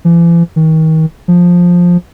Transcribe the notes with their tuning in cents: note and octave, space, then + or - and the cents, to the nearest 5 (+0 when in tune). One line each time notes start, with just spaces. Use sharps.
E3 +45
D#3 +35
F3 +10